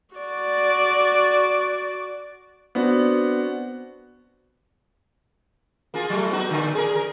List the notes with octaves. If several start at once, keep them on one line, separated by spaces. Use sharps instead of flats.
F#4 D5
B3 C4 D4 F#4
A#3 F4 G#4
F#3 A3
B3 D#4 F#4
A#2 D3
G#4 A#4
A#4